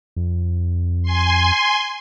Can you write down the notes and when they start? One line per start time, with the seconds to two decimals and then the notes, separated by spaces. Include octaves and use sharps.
0.16 F2
1.03 G#5 C6